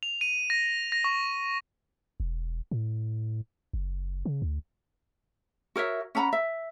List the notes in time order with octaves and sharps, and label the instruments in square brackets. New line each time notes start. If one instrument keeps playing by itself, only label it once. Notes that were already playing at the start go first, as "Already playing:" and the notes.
[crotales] F7
D#7
A#6
A#6
C#6
[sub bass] E1
A2
F#1
C#3
D2
[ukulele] F#4 A#4 C#5 E5
C#4 F#5 A#5 B5
E5